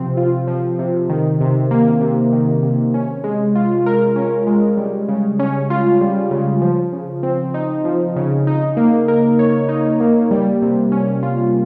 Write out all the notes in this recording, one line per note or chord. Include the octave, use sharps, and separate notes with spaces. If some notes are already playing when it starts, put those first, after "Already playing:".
Already playing: C3 F3 C4
F4
F3
C3
D#3
C3
A#3
C3
D#3
C3
C#4
G#3
F4
A#4
C#4
G#3
G3
C#3
C#4
F4
G3
C#3
F3
C#3
C4
D#4
F3
C#3
D#4
A#3
A#4
C#5
D#4
A#3
G3
C3
C#4
F4